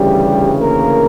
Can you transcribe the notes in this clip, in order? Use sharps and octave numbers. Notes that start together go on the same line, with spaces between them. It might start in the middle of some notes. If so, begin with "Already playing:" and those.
Already playing: D2 C#3 E3 G3 G4
A#3 A#4